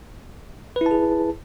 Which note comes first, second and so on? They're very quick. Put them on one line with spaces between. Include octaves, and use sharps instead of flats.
B4 E4 A5 G#4